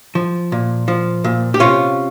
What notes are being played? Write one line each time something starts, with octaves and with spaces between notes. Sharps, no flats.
F3
A#2
F3
A#2
G4
C3 C#4 F4